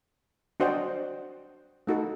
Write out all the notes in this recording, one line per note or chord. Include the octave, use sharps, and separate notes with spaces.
D4 F#4 C5 D#5 G5
A3 D#4 F#4 A4